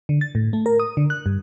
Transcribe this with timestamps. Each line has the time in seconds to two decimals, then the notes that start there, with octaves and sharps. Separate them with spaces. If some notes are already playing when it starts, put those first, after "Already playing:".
0.09 D3
0.21 A6
0.35 A2
0.53 A3
0.66 A#4
0.80 D#6
0.97 D3
1.10 F#6
1.26 G2